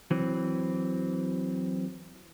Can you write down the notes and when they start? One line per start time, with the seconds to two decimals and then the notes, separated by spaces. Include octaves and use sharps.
0.11 E3 F#3 C4